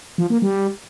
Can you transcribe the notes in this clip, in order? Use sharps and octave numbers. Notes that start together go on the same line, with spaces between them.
F3
A#3
G3